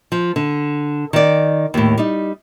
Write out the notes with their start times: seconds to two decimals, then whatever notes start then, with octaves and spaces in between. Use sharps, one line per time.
0.12 F3
0.36 D3
1.13 D#3 D5
1.74 D#2 A2
1.98 G3 D#4